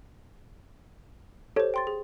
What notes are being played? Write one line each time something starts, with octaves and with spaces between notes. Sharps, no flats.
G4 A4 C5 C#5
G5 C6 A6
G#4